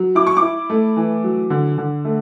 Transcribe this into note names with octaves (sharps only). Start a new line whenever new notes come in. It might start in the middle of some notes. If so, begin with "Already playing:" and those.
Already playing: F#3
E4 D6
C#6
D6
E4
A3
E3
F#3
D3
D3
A3